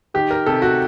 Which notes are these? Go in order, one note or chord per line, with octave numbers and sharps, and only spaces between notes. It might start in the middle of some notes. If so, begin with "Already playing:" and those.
D#3 G4
A#4
C3 A4
F#4